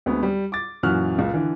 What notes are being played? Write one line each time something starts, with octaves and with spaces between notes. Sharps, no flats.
D2 G#3 B3 C4
G3
D6 A6
F#2 A#2 E3 F#4 F6 F#6
C#2 A#2
D3 E3